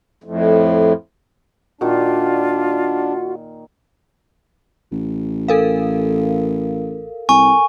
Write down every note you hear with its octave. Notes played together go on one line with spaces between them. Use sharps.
F2 A2
A#2 D#3 D4 F4 F#4
A1
A4 A#4 F5
C2 G#5 C#6